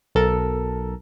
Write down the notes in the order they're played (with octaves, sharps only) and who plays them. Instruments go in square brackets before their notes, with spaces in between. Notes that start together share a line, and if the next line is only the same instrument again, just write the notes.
[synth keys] B1 A4 A#4